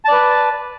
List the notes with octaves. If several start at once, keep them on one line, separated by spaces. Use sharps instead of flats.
B4 D5 A5